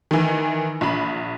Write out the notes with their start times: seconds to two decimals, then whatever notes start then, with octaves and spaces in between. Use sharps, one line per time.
0.11 D#3 E3
0.81 A#1 B5